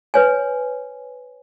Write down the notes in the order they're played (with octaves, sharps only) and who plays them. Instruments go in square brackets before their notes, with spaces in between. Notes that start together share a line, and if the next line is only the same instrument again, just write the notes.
[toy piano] B4 C#5 G#5